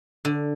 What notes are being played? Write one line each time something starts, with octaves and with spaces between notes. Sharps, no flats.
D3